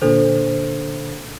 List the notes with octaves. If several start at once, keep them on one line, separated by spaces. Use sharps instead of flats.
A#2 D3 D4 A4 C5